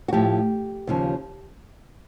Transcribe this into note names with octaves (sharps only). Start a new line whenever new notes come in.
F#4
A2 F3 G4
D#2 C#3 F3